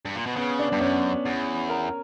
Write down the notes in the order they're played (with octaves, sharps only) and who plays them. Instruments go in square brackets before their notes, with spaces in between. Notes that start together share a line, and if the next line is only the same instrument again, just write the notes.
[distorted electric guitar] G2
A#2
B2
[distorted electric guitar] C#3 [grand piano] B3
[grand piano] D4
[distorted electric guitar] G2 [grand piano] B3
[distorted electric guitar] F#2 [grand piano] C#4
[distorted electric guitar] E2
[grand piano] A#4